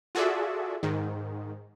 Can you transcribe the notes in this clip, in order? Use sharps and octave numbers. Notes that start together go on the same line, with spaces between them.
F4 F#4 G#4 A4 D5 E5
G#2 D#3